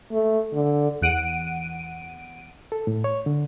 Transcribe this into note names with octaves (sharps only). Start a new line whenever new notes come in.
A3
D3
E2 F#5 D7 D#7
A4
A2
C#5
D3